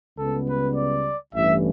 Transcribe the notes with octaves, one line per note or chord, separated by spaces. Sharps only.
C#2 C#3 G3 B3 A4
B4
D5
A1 G2 E3 E5